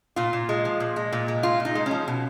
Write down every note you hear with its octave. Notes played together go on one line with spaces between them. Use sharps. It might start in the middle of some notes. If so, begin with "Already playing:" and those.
A#2 F4
A#2
G#3
F3
A#2
G#3
A#2
G#3
A#2 F4
A#2
D#4
G#3
C#4
F3
B2